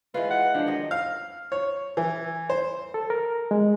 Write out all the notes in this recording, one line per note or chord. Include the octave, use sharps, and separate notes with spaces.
E3 G#3 F4 B4
F#5
F3 G#3 D4
D#3 F#3 D#5
F5
C#5
E3
C5
A4
A#4
G#3